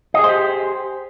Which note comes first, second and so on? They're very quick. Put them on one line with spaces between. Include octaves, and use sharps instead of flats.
D#5 G#4 C5 G4